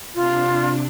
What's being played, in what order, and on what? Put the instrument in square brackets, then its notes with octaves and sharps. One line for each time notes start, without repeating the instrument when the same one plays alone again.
[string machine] C3 D4 [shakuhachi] F4